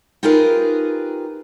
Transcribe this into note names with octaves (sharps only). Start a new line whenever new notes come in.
D#4 F4 G4 G#4 A#4 B4